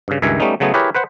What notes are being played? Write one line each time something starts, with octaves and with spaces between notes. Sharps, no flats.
G2 C#3
C#2 G2 D#3 E5 G#5
G3 A3 B3 C#4 D#4
C#3 F#3 A3 B3 G#4
E4 G4 G#4 A#4 B4 C#5
B4 C5 F#5